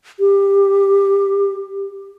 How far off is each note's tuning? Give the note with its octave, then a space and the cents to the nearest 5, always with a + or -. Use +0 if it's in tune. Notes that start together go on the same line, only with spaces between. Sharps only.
G4 +15